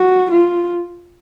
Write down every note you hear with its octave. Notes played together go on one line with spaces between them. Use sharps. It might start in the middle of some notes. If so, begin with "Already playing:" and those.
Already playing: F#4
F4